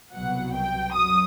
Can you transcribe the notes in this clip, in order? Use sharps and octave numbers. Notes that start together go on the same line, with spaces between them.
C2 B2 F#3 F#5
G5
F#2 F#3 D#6